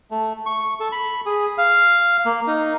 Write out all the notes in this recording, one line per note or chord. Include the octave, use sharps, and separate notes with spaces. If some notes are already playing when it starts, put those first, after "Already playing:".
A3
C#6
A4
B5
G#4
F5
A#3
D#4